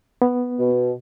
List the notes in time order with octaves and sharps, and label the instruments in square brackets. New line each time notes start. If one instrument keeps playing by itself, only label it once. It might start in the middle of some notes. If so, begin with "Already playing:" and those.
[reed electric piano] B3
[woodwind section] B2